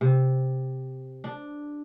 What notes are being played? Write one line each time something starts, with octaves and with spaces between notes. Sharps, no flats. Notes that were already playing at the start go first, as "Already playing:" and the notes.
C3
D4